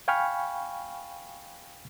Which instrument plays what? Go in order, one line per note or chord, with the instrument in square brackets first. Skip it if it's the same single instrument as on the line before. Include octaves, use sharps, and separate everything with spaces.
[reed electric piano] F5 G5 G#5 B5 C#6 F6